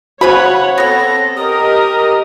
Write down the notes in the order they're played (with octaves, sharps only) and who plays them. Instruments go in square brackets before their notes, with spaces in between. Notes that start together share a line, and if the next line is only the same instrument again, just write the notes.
[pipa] C#3 C#4 B5 [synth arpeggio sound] F#4 C5 [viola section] C#5 F#5
[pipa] B3 C#5 [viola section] C4 A4 [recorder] A#6
[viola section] G4 A#4 D#5 [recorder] D#6